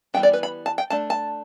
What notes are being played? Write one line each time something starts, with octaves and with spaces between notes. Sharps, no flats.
E3 G3 B3 D4 G5
D5
B4
B5
A5
G5
A3 D4 A5
A5